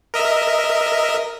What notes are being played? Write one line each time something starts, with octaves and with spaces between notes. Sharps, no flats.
A#4 D#5 E5